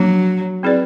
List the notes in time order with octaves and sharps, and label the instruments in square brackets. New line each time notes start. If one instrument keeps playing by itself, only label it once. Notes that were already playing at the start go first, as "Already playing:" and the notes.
Already playing: [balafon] F3 A#3 D4 F#4 [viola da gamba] F#3
[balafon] C4 E4 G#4 B4 D5